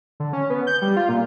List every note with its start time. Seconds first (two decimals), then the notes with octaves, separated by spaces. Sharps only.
0.20 D3
0.33 C#4
0.50 B3
0.67 G6
0.82 G3
0.97 F4
1.09 A#2